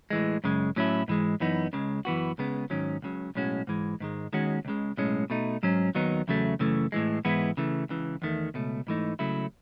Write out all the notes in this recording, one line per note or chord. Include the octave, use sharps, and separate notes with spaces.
A2 E3 G#3
F#2 C#3 G#3
A2 F#3 C#4 E4
G#2 E3 G#3
F#2 E3 B3 D#4
C#2 C#3 G#3
F#2 E3 B3 F#4
C#2 C#3 G#3 B3
G#2 D#3 F#3 C#4
C#2 C#3 F#3
B1 A2 G#3 C#4 F#4
G#2 E3 G#3
G#2 D#3 G#3
D#2 D#3 G#3 C#4 F#4
C#2 C#3 G#3
B1 A2 G#3 C#4
B2 A3 D#4
G#2 F#3 C#4
D#2 D#3 F#3 B3 D#4
E2 C#3 F#3 A3
F#2 C#3 E3 A3
A2 E3 G#3
G#2 E3 G#3 B3 E4
C#3 E3 A3
C#2 C#3 E3
E2 D#3 A3
C#2 B2 A3
G#2 E3 A3 D#4
C#2 C#3 F#3 A3 E4